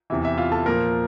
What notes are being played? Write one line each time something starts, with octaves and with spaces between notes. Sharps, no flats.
E2 C3 E3 E5
E5
F4 F5
A4 A5
A#2 F3 A#4 A#5